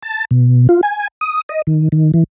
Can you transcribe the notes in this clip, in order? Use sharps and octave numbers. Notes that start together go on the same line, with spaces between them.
A5
B2
F4
G#5
D#6
D#5
D#3
D#3
E3